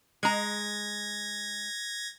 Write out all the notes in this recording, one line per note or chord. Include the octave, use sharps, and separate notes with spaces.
G#3 A#5 G#6 A#6